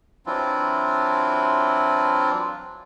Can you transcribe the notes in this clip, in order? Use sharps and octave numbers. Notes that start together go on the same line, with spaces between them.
E3 F#3 C4 D4 E4 F4